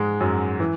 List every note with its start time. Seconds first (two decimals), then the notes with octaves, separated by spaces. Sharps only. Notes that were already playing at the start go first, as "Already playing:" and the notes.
Already playing: G#2 G#3
0.20 F#2 F#3
0.60 E3